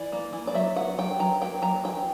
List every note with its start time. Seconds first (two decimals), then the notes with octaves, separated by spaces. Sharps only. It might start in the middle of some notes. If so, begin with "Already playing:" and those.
Already playing: E3 D5
0.12 A#3
0.33 E3
0.47 D5
0.54 F#3 E5
0.76 B3 F#5
0.98 F#3 G5
1.19 F#3 A#5
1.41 A#3 G5
1.62 F#3 A#5
1.84 E3 G5